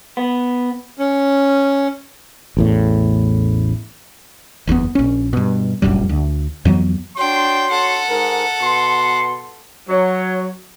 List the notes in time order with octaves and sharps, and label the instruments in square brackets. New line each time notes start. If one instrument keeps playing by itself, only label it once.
[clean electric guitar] B3
[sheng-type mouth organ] C#4
[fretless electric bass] A1 E2 A2
F#1 E2 C#3 B3
A#1 C#4
G2 B2
F1 A#1 F#2 G3
D2
F2 E3 F#3 B3
[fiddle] D4 G5 [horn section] F#4 C#5 C6
[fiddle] A4 F#5
[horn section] G#2 A#4
B2 C6
F#3 C#5